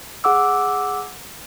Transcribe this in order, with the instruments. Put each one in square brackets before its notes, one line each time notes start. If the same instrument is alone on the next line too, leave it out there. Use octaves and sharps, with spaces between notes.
[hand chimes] G#4 F#5 D6 E6